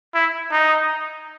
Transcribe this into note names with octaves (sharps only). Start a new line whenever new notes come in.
E4
D#4